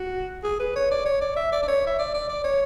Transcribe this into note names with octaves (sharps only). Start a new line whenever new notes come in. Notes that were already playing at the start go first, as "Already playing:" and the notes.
Already playing: F#4
G#4
B4
C#5
D5
C#5
D5
E5
D5
D5
C#5
E5
D5
D5
D5
C#5